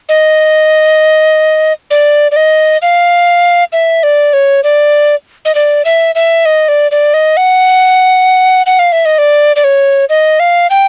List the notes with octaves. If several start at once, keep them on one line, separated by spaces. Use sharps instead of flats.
D#5
D5
D5
D#5
F5
E5
D5
C#5
D5
D#5
D5
E5
E5
D#5
D5
D5
D#5
F#5
F#5
F5
E5
D#5
D5
D5
C#5
D#5
F5
G5